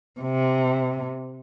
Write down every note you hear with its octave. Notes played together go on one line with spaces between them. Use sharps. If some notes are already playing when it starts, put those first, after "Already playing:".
C3